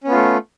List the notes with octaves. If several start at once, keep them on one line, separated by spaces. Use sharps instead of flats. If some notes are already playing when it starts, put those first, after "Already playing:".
A3 B3 C#4 F4